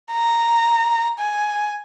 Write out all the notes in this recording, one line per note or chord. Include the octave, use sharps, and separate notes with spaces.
A#5
G#5